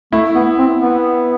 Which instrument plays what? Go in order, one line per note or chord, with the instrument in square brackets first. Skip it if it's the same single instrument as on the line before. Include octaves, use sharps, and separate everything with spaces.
[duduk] A3 [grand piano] E4
[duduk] B3
C4
B3